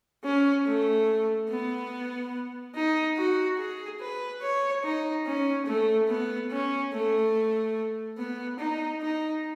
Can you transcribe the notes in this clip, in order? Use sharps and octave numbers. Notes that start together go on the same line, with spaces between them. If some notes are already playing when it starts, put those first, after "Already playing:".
C#4
A3
B3
D#4
F#4
G#4
B4
C#5
D#4
C#4
A3
B3
C#4
A3
B3
D#4
D#4